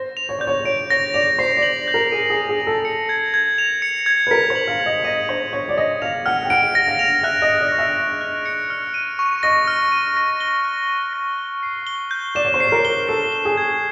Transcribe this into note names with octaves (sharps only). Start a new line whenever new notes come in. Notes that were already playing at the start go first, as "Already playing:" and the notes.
Already playing: C5 A#6
F7
C#5
D5 G6
C#5
C#5 D7
C#5 A#6
D5 F7
C5 C7
D5
F#7
G6
A#4
G#4 D#7
G#4
C7
G#4
F#7
A4
C#7
G#6
G#6
F7
C#7
G#6
B4
A#4 B6
C5
F#7
F5
G#6
D#5
D#5 D#7
C5 B6
C#5 F#7
D5
D#5 A#6
F5 F7
F#5 F6
G5
F#5 D7
A#6
F5
F7
E5 F#6
D#5
C#7
D5
C#6
E5
A#6
F#6
C#7
F6
D#7
C#6
D#5 A#6
F6
D#7
A#6
G7
F#6
D#7
A#6
G7
C7
G7
G6
D5 E7
C#5
C5
C#5 C7
A#4
G7
A4 C7
G7
G#4
G#6